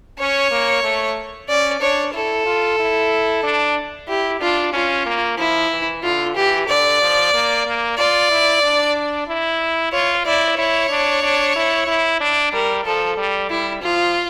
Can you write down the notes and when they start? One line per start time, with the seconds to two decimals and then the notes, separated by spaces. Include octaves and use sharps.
0.19 C#4 C#5
0.51 A#3
0.84 A3
1.49 C#4 D5
1.81 D4 C#5
2.14 E4 A4
2.46 F4
2.79 E4
3.43 D4
4.08 E4 G4
4.41 D4 F4
4.73 C#4 F4
5.06 A#3
5.38 F3 E4
5.71 E3
6.03 D3 F4
6.36 E3 G4
6.68 D3 D5
7.01 F3
7.34 A#3
7.66 A#3
7.98 F4 D5
8.31 E4
8.63 D4
9.28 E4
9.93 F4 C#5
10.25 E4 D5
10.58 E4 C#5
10.90 D4
11.23 D4
11.56 E4
11.87 E4
12.20 D4
12.53 G3 A#4
12.85 F3 A4
13.17 G3
13.50 G3 E4
13.82 F3 F4